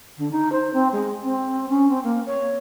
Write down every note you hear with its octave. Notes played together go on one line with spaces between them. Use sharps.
D3
D#4
C5
C4
G#3
C4
C#4
C4
A#3
C#5